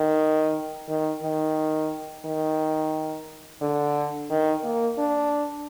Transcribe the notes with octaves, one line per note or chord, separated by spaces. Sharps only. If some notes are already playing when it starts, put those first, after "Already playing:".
Already playing: D#3
D#3
D#3
D#3
D3
D#3
A#3
D4